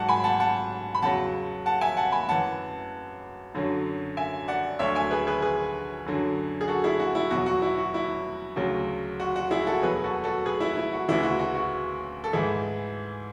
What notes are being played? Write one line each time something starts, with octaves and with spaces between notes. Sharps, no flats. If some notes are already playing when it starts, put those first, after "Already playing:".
Already playing: G#2 F#3 F#5 A5
G#5 B5
F#5 A5
F#5 A5
B5
E2 C#3 F#3 F#5 A5
F#5 A5
E5 G#5
F#5 A5
G#5 B5
F#2 E3 F#5 A5
F#2 D3 F#3
E5 G#5
D5 F#5
D2 D3 F#3 C#5 E5
E5 G#5
G#4 B4
G#4 B4
G#4 B4
F#2 D3 F#3
G#4
F#4 A4
E4 G#4
F#4
E4
E2 B2 F#3 F#4
F#4
E4
F#4
E4
D2 C#3 F#3
F#4
F#4
E4 G#4
F#4 A4
E2 B2 F#3 G#4 B4
F#4 A4
F#4 A4
G#4 B4
E4
E4
F#4
D2 C#3 E3 E4 G#4
F#4
F#4
F#4
A4
G#2 E3 E4 G#4